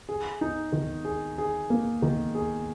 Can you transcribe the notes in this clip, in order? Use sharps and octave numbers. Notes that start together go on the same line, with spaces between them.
G#4
D#4
D#3
G#4
G#4
A#3
D#3
G#4